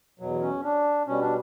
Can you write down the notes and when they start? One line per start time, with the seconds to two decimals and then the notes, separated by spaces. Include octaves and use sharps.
0.20 E2 B2 F#3
0.41 C#4
0.63 D4
1.07 B2 G3 C#4
1.21 D4